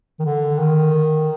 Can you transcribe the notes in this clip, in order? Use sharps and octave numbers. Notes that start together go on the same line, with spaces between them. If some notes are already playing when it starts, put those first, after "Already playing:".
D#3
D3
D#3